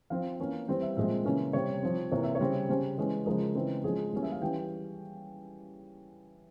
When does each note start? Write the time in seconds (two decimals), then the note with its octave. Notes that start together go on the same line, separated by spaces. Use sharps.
0.10 F3 C4 F5
0.40 E3 A#3 C#4
0.68 E3 G3 C4 G5
0.82 E5
0.97 A#2 F3 G#3 C4 E5
1.25 C#3 E3 A#3 C#4
1.53 C3 G3 C4 C#5
1.83 F3 C4
2.11 C3 E3 A#3 C#5
2.24 E5
2.35 C#5
2.40 C#3 G3 C4
2.69 C#3 G3 C#4 C5
2.98 E3 G#3 C#4
3.26 C#3 F3 G#3 A#4
3.55 C#3 E3 G#3 C4
3.84 F3 G#3 C#4 G#4
4.13 E3 G3 A#3 C#4
4.23 E5
4.32 F5
4.41 E3 G3 C#4 G5